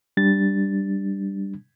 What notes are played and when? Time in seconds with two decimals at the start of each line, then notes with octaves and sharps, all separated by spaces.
0.17 G3 D4 A6